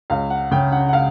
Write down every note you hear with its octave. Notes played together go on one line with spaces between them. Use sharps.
C#2 F5
F#5
C#3 G5
F#5
F#5
F5